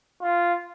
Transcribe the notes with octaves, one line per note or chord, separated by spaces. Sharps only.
F4